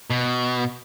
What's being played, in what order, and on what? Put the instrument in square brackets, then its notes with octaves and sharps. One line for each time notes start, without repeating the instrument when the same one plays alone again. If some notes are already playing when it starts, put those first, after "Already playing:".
[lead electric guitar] B2